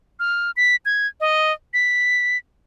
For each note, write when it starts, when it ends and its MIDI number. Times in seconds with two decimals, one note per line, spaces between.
0.20 0.51 89
0.57 0.76 95
0.85 1.07 92
1.20 1.52 75
1.74 2.38 95